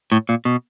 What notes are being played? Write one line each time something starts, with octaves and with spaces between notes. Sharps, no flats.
A2
A#2
B2